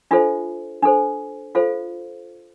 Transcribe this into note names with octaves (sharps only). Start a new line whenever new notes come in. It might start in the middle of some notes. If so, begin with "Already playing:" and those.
D4 F4 A4 C5 E5
D4 A4 C5
F4 A4 C5 F5